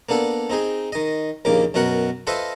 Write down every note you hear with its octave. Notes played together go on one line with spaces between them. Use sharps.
A#3 B3 D4 A4
C4 D#4 G#4
D#3 D#5
A#1 D#2 C#3 A#3 D6
F#2 B2 F#4 A#4 F#5
F4 A4 B4 C5 D#5 E5